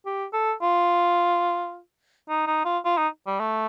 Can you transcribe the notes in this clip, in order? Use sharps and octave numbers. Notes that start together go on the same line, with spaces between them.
G4
A4
F4
D#4
D#4
F4
F4
D#4
G3
A3